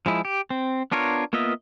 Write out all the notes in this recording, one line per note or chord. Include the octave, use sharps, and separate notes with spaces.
F3 G#3 E4
G4
C4
B3 D4 F4 A#4 C#5
A#3 B3 F4 D#5 E5